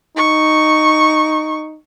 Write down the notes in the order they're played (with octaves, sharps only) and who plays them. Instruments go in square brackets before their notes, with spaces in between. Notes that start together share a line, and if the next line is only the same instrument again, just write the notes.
[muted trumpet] D#4 [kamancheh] C#6